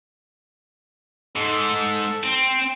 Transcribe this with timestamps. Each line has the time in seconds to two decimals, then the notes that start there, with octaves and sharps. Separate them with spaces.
1.36 G#2 A4
2.24 C4